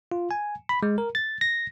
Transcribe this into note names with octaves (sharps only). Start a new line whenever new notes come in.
F4
G#5
B5
G#3
A#4
A6
A#6